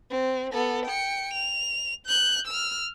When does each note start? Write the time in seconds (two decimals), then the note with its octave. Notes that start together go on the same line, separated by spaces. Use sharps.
0.11 C4
0.53 B3 A4
0.86 G5 C#7
1.34 F7
2.06 F#6 G6
2.47 E6 F6